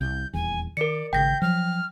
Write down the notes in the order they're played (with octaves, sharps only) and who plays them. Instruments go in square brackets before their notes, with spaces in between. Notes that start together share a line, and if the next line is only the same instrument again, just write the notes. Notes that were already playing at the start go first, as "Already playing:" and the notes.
[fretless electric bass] C2 [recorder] G6
[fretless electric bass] D#1 E2 [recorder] G#5
[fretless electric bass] D#3 [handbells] A#4 C#7 [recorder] D5
[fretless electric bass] G#1 C#3 [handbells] G5 A#6 [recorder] G6
[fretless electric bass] F3 F#3 [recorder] F6